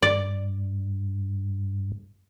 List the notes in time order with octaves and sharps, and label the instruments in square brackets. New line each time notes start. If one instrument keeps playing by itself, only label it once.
[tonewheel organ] G2 [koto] D5